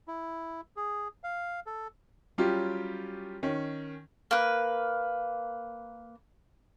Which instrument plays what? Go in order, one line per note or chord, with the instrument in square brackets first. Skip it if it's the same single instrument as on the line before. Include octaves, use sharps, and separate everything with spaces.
[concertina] E4
G#4
F5
A4
[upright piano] F#3 G3 C#4 F4 G4
D#3 C#4
[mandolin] A#3 B4